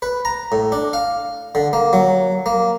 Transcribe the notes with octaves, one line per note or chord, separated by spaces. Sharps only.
B4
A#5
A2
D4
F5
D3
A#3
F#3
A#3